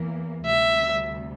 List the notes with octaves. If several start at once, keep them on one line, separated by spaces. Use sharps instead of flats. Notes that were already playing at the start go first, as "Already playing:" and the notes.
Already playing: E2 E3 A#3
D2 C3 G3 E5